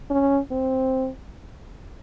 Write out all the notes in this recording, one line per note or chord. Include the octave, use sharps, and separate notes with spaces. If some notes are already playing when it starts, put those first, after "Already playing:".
C#4
C4